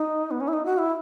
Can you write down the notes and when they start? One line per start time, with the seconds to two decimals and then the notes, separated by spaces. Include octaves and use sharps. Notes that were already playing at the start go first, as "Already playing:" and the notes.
Already playing: D#4
0.31 B3
0.40 C#4
0.48 E4
0.53 D#4
0.65 F#4
0.78 E4